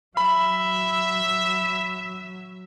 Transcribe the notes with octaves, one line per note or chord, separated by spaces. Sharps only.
F#3 E5 B5